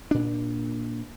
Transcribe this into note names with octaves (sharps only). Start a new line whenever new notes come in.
A#2 D4